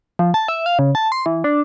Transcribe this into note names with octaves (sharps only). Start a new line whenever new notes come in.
F3
A5
E5
F5
C#3
A5
C6
E3
D4